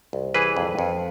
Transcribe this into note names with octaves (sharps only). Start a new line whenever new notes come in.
C2
E3 G#4 B4
F2
F2